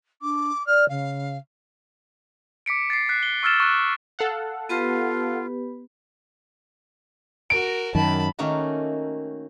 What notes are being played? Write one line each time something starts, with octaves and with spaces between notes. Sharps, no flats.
D4 D6
D5 F6
C#3 F5
D6 B6 C#7 D7
A6 C7
F#6 B6 C7
G7
C#6 E6 F6 A6 E7
C#6 F#6
A4 F5 F#5
B3 F4 G4 B4
F#4 A#4 D7
F#2 D#3 A5 B5
D#3 A3 A#3 C#4 D#4 F#4